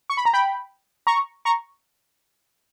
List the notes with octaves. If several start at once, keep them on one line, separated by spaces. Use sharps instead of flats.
C#6
B5
A#5
G5 B5
A#5 C#6
A#5 C#6